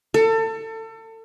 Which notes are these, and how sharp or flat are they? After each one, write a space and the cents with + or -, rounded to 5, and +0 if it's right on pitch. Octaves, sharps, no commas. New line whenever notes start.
A4 +30